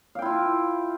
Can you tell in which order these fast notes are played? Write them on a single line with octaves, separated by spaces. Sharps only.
F5 G5 E4 F4